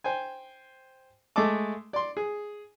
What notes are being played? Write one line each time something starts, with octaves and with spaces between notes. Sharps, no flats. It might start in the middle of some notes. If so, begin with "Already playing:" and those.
C5 G5 G#5
G#3 A3 A4 D#5 A5 D6
D5 C6
G#4